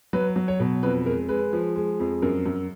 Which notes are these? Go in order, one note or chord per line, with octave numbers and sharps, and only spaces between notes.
F#3 B4
F#3
C#5
B2
F2 B4
G#3 A#4
G#3 B4
F3
G#3
F2
F#2 A#4
F#2